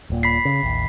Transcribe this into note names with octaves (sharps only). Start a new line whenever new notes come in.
D#1 A#2
B5 B6 C7
C#3
A1 D#2